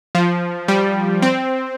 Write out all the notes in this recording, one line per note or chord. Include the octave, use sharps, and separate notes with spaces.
F3
G3
C4